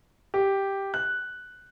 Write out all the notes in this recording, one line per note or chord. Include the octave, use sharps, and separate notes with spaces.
G4
F#6